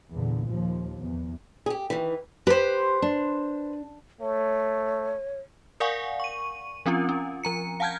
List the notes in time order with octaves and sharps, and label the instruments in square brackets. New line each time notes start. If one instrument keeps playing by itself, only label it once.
[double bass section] E2 A#2 D3
D#2 F3
E2
[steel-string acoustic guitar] G4 G#4
D#3 E3
[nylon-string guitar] G4 [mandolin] B4 C5
[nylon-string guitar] D4
[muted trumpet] A3 [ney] C#5
[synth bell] A#4 D5 F5 F#5 G#5 C#6
C#6 D#7
F3 C4 C#4 F4
C#4
F3 A#5 C#7
F5 F#5 A5 F6 G6 G#6